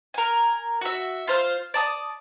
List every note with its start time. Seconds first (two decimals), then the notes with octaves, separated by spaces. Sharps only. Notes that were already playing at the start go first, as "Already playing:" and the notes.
0.14 A#4 G#5
0.81 F#4 E5
1.28 F4 C5 F5
1.74 D5 A5 D#6